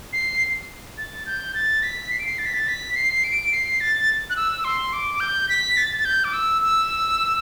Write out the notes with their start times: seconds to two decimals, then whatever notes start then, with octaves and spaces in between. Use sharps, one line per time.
0.13 C7
0.98 A6
1.26 G6
1.55 A6
1.83 B6
2.11 C7
2.19 D7
2.26 C7
2.38 A6
2.46 B6
2.54 A6
2.68 B6
2.96 C7
3.24 D7
3.52 C7
3.80 A6
4.30 F#6
4.36 E6
4.64 C6
4.93 D6
5.20 G6
5.49 B6
5.77 A6
6.00 A6
6.05 G6
6.24 D6
6.33 E6
6.62 E6